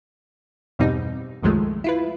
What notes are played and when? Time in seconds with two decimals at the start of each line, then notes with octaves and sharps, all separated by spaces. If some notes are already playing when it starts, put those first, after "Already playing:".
0.79 E2 G2 B2 G3 C4 D#4
1.43 C2 F#2 D#3 F3 G#3 A3
1.84 E4 F4 B4